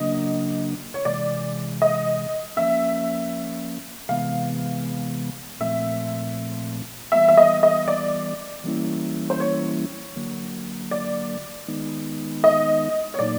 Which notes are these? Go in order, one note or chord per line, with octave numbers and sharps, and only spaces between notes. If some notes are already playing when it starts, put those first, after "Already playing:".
Already playing: C#3 F#3 A#3 D4 D#5
C#5
C3 E3 G#3 D5
D#5
F3 A#3 C#4 E5
C3 E3 G#3 B3 F5
A#2 F3 A3 C4 E5
E3 G3 B3 E5
E5
D#5
D#5
D5
E3 G3 A#3 C#4 E4
C5
C#5
D3 F#3 A#3
D5
D#3 G#3 B3 D#4
D#5
C#5
A#2 F#3 A#3 D#4 D5